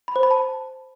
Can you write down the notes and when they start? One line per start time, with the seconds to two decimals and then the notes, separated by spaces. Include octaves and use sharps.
0.08 B5
0.16 C5
0.23 B5
0.31 A5